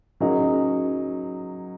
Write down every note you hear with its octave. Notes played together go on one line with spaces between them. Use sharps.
C#3 F#3 A#3 D#4 G#4